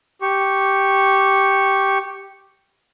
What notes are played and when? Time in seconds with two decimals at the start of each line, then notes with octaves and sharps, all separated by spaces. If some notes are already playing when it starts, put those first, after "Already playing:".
0.22 G4 C#6